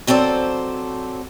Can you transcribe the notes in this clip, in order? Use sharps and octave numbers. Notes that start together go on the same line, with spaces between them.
F#3 C4 A4 C5 D5